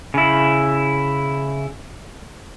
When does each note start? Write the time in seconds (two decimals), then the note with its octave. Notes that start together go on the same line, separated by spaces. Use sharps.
0.14 C#3 E4